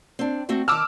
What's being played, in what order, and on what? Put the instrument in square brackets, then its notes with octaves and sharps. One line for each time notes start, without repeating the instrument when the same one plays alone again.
[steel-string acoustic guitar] C4 D4
A3 C4 F#4
[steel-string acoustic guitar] D#3 A5 [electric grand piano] D6 E6 F6